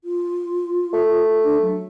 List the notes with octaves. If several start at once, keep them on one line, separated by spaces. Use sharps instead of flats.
F4
A3
D4
F#3